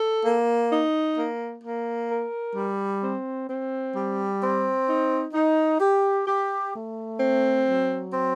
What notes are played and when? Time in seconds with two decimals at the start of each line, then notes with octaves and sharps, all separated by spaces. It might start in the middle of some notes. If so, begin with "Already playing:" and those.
Already playing: A4
0.25 A#3
0.71 D#4
1.17 A#3
1.63 A#3
2.10 A#4
2.56 G3
3.02 C4
3.48 C4
3.95 G3
4.41 C4
4.87 D#4
5.33 D#4
5.80 G4
6.26 G4
6.73 A3
7.19 C4
7.65 F#3
8.11 C4